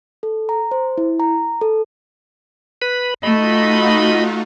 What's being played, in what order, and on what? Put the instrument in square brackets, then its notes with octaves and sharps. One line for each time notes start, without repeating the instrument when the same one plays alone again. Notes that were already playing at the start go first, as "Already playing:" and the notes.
[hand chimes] A4
A#5
C5
E4
A#5
A4
[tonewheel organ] B4 B5
[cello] A3 [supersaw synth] D#4 F4 F#4 [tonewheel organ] D#5 B5